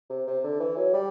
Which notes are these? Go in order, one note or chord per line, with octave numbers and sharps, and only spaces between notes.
C3
C3
D3
E3
F#3
G3